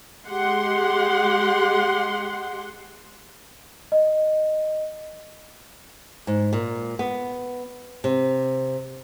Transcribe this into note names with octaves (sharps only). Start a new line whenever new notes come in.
G#3 G4 F#5 C6
D#5
G#2
A#2
B3
C3